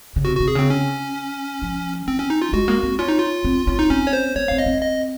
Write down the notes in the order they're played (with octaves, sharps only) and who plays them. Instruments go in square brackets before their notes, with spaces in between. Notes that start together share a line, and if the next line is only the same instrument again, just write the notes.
[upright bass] C#3
[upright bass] C3 [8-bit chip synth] F#4
[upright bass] C3 [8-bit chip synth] F#4
[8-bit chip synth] G#4
[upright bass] C#3 [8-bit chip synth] C4
[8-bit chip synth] C#4
[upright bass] F3
[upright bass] F#3 [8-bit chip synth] C4
[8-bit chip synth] C#4
D#4
F4
[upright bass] G#3 [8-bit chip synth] F#4
[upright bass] A#3
C4
[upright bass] C#4 [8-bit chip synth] F4
[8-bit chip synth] D#4
F4
[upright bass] C4
C#4
[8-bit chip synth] D#4
[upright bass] C4 [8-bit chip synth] C#4
[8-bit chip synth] C#5
C5
[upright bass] A#3 [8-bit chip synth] C#5
[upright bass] C4 [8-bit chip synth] F5
[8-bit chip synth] D#5
[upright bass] C4
[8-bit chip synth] D#5